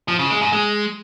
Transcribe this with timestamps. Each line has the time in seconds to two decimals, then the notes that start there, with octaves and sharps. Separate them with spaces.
0.08 F3
0.19 C#3
0.30 G#3
0.41 G#2
0.53 G#3